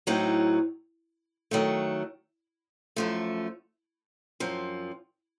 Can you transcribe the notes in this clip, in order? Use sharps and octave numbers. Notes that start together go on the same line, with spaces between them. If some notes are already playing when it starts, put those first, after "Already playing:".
A2 F#3 C4 D#4
D#3 F#3 A3
F#2 F3 A3
F#2 F3 C4